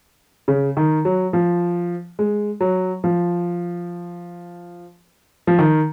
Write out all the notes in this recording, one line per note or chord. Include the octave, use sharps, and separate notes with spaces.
C#3
D#3
F#3
F3
G#3
F#3
F3
F3
D#3